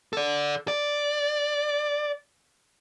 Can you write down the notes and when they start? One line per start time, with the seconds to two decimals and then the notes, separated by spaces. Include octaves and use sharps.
0.13 A4 D5
0.68 D5